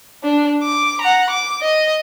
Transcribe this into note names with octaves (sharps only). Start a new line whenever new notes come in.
D4
D6
F#5 A#5
D6
D#5